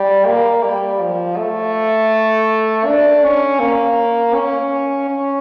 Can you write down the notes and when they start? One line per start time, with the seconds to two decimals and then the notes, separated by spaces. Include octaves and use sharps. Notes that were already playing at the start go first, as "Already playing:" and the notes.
Already playing: G3
0.26 A#3
0.63 G3
1.01 F3
1.37 A3
2.86 D4
3.24 C#4
3.60 A#3
4.35 C#4
5.09 C#4